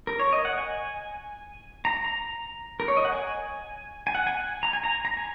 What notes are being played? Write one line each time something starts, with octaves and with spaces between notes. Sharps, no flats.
A#4
C#5
D#5
F#5
G#5
A#5
A#5
A#4
C#5
D#5
F#5
G#5
G#5
F#5
G#5
G#5
A#5
G#5
A#5
A#5
G#5